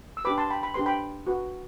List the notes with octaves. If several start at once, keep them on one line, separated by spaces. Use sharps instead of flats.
E6
D4 G4 B4 B5 D6
A5 C6
G5 B5
B5
D4 G4 B4 C6
G5 B5
F#4 B4